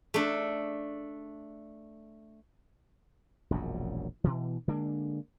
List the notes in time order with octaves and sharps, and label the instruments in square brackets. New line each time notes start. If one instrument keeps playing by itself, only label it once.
[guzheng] A3 D4
[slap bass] E1 A#1 F#2 F#3
B2 E3
D3 G#3 A#3 D4